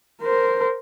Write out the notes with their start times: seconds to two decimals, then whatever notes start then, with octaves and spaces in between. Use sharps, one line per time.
0.21 A#4 C5